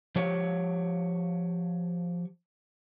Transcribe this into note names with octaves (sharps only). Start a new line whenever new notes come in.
F3 G4 C#5